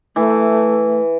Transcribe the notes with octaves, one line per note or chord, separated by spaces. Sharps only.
E3 A3